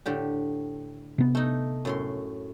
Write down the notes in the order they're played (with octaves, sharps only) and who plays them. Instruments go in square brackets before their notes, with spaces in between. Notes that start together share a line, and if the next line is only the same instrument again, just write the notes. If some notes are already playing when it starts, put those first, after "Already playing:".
[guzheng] A2 D3 G4
[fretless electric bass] C3 B3
[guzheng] A3 D#4
F#2 A2 C6